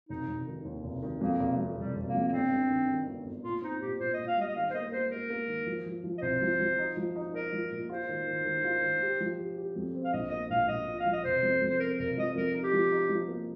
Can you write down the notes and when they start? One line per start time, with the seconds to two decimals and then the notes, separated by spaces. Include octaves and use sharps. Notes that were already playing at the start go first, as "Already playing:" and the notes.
0.09 F1 D#4
0.27 F1
0.47 D#3
0.65 D#2
0.84 F1
1.02 D#3
1.21 F2 A#3
1.40 F1
1.58 F2
1.77 F1 G3
1.96 F1
2.05 A#3
2.14 F2
2.28 A#3
2.33 G1 C4
2.51 G2
2.70 D#3
2.88 D#3
3.06 G1
3.26 G1
3.43 A#2 F4
3.62 C4 D#4
3.81 A#2 G4
4.00 A#2 C5
4.14 A#2 D#5
4.27 F5
4.37 G3 D#5
4.48 D#5
4.56 D#3 F5
4.70 C5
4.74 A#3 D#5
4.92 A#3 C5
5.11 A#3 A#4
5.30 A#3
5.48 D#3
5.67 F3
5.86 F3
6.04 F3
6.18 D#5
6.22 C2 C5
6.42 F3
6.60 F3
6.78 D#4
6.97 F3
7.16 D#4
7.34 D#4 A#4
7.53 F3
7.72 A#2
7.89 F4 C5
8.09 D#3
8.27 D#3
8.45 D#3
8.64 F4
8.82 D#3
9.02 G4
9.21 F3
9.39 G4
9.57 G4
9.76 F2
9.95 C4
10.05 F5
10.13 A#1 D#5
10.31 A#3 D#5
10.50 A#1 F5
10.68 A#1 D#5
10.88 A#2
11.00 F5
11.06 F3
11.13 D#5
11.24 F1 C5
11.42 F2
11.61 F2
11.70 C5
11.80 C4 A#4
11.98 F1 A#4
12.17 F3 D#5
12.35 F2 A#4
12.54 D#4
12.64 G4
12.73 F3
12.92 D#4
13.10 F3
13.28 A#3